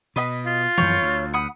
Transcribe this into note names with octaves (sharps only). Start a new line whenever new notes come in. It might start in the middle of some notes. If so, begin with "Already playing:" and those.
B2 B4 D#5 B5
F4
F#2 E3 F3 C#5 B5 G6
D2
F#5 B5 D#6